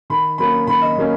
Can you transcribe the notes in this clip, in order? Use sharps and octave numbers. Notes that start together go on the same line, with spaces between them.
D#3 B5
F#3 A#3 C#4 B5
D#3 B5
D#5
F#3 A#3 C#4